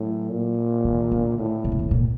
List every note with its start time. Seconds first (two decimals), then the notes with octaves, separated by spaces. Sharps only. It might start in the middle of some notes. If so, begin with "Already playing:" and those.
Already playing: A2 F#3
0.31 A#2
0.85 D#3
1.11 D3
1.38 A2
1.64 C3
1.72 D3
1.79 C3
1.91 A#2